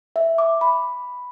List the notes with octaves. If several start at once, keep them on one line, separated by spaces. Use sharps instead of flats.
E5
D6
B5